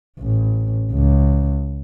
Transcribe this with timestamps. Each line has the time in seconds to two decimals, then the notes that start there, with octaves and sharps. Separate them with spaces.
0.20 A1
0.92 C#2